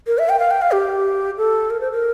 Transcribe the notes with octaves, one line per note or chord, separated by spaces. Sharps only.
A#4
E5
G5
F5
G5
F5
G4
A4
A#4
C5
A#4